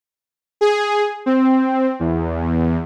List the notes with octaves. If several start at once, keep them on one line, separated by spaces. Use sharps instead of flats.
G#4
C4
E2